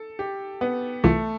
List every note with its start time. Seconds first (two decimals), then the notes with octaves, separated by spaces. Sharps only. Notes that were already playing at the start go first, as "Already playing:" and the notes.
Already playing: A4
0.19 G4
0.61 B3
1.04 C2 C3 E3 A3 B3 F4